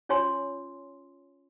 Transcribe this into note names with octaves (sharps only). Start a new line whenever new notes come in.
C#4 F4 C#5 G#5 C6